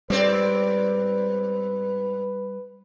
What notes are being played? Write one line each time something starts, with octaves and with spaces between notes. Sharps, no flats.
G#2 G3 C4 B4 D5